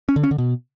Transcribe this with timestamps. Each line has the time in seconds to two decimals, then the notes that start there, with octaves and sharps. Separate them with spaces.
0.09 C#4
0.16 D3
0.23 C#4
0.31 D3
0.38 B2